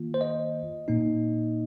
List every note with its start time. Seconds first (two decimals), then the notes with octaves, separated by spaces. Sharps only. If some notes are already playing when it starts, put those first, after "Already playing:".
Already playing: D#3 A#3 F4
0.14 C5
0.21 D#5
0.88 A#2 A#3 D#4